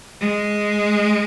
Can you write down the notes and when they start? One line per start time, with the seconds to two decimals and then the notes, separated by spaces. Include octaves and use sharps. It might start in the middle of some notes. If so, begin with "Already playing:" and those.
0.21 G#3